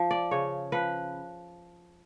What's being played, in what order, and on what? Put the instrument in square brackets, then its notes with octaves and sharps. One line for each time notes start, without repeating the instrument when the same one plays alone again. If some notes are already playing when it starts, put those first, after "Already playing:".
Already playing: [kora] F3
D5
C#3 C#5
F3 B4